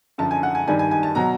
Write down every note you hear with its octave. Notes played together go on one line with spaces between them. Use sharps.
F#2 D3 F3 A5
G#5
F#5
G#5
G2 D#3 G3 G#5
G#5
G#5
A5
B2 F#3 A#5